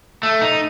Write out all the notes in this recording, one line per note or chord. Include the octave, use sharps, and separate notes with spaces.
A3
D#4